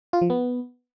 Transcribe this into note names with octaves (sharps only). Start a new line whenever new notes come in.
F4
F3
B3